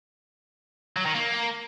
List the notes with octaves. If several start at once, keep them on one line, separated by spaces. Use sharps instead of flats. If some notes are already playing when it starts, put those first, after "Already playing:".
F#3
D#3
A#3